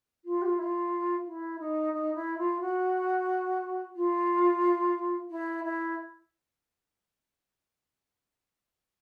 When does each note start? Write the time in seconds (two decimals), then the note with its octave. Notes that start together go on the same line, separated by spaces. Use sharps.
0.24 F4
0.41 G4
0.45 F4
0.58 E4
0.62 F4
1.26 E4
1.59 D#4
1.93 D#4
2.15 E4
2.38 F4
2.60 F#4
3.96 F4
5.30 E4
5.64 E4